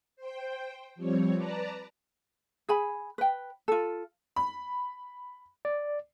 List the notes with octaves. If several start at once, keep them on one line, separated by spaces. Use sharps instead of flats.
C5 G5
F3 G3 C4 C#5
B4 D5 A5 A#5
G#4 G#5 B5
B4 G5
F4 A4
B5
D5